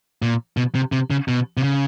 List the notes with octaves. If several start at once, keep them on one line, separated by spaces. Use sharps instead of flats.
A#2
B2
C3
C3
C#3
B2
C3
C#3